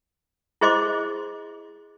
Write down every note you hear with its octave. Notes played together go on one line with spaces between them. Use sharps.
E4 G#4 C5 D#5 C6 D6